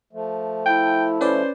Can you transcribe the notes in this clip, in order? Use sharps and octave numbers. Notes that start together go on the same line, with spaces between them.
F3 A3
E4 G5
C#4 B4 C5 D5